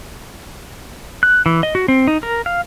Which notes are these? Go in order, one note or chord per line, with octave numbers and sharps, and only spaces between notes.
F#6
E3
D#5
F#4
C4
D#4
A#4
F5